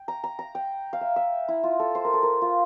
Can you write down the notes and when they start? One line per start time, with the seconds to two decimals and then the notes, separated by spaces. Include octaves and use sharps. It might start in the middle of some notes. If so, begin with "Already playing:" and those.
Already playing: G5
0.08 A#5
0.24 A#5
0.39 A#5
0.55 G5
0.93 F5
1.01 E5
1.16 E5
1.48 E4
1.63 F4
1.79 A4
1.95 C5
2.05 A#4
2.14 A4
2.23 A#4
2.42 F4